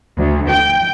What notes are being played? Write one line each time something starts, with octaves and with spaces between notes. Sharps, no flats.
D2
G5